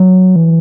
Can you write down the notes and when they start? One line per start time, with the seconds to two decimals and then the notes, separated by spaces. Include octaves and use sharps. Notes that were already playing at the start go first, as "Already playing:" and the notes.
Already playing: F#3
0.36 E3